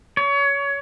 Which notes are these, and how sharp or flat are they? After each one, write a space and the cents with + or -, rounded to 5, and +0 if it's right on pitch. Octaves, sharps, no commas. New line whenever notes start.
C#5 +25